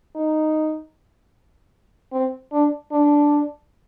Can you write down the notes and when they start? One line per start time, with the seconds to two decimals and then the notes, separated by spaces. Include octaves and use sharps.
0.16 D#4
2.13 C4
2.52 D4
2.92 D4